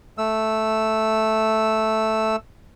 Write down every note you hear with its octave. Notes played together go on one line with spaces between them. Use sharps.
A3 E6